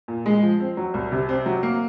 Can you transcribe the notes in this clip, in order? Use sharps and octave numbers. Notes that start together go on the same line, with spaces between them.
A#2
G#3
F3
C4
F#3
C2
C3
C4
F#3
A#3